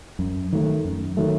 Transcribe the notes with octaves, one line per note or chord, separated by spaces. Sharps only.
F#2
D#3 F#3 A3
F#2
D#3 F#3 A3